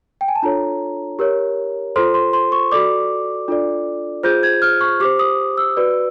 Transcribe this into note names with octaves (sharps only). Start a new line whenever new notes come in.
G5
G#5
A5
D4 F4 A4 C#5 A#5
G4 A#4 C#5
F4 A4 C5 C6
C6
C6
C#6
F#4 A4 D5 D6
D4 F4 A4 D5
F4 G#4 C5 G6
G#6
F6
C#6
G4 C5 D6
D#6
E6
F#4 B4 D5